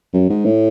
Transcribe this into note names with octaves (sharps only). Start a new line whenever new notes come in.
F#2
G#2
A2